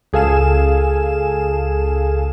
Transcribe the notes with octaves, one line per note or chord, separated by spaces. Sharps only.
C#2 G#4 A4 F5 G#5 E7